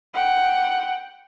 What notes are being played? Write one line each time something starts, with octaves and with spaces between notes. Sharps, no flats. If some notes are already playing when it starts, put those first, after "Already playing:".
F#5 G5